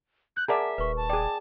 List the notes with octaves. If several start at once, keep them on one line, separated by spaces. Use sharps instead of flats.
F#6 G6
G#4 A#4 D5 E5 F#5 A5
D#1 B4 C#6
A5
G#4 D5 G5